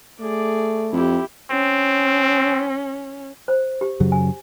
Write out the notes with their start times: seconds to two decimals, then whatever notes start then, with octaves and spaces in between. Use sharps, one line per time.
0.20 A3 G#4 D5
0.93 F2 E4 G4
1.51 C4 C#4
3.48 C5
3.81 G4
4.00 F#2 C#3 F#3
4.12 G#5